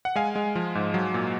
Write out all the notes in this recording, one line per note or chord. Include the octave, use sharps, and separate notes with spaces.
F#5
G#3 F5 G#5
G#3
F3
G#2
F#3
A#2